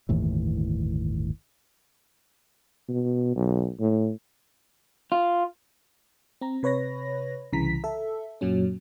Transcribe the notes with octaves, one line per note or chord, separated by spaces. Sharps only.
G1 D#2 A2 E3
B2
B1
A2
F4
C4 A#5
C3 B4 C#5 B5 A#6
C2 C#3 E3 A#5 B6
A4 E5
F#2 A#2 F#3 C#4